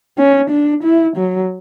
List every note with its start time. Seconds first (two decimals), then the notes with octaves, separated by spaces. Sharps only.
0.18 C#4
0.51 D4
0.84 E4
1.17 F#3